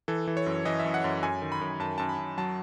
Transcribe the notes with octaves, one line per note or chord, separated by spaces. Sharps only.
E3 A4
E3
C#5
F#2
E3 D#5
E5
F#2
F#5
F#2
F#2 G#5
D#3
B5
F#2
F#2 A5
F#2 A5
B5
F#2
F#3 A5